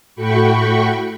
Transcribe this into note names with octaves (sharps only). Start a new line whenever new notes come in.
A2 A3 F#4 G5 B5 C#6